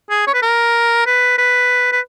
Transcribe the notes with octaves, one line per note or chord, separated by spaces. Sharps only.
G#4
C#5
B4
A#4
B4
B4
B4